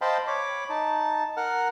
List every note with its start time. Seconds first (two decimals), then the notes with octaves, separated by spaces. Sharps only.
0.01 C5 D#5 F5 G5 A5 B5
0.27 C#5 B5 D6
0.70 D#4 A5
1.37 A#4 F#5 F6